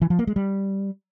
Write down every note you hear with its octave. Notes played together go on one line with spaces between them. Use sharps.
E3
F3
A#3
G#3
G3